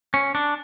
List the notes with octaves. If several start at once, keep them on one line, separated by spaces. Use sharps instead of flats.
C#4
D4